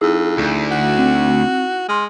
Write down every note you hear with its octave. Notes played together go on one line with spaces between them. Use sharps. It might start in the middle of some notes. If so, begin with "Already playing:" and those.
F2 D#4 E4 G#4 E6
D2
F#4
C4
G#3 C6 F6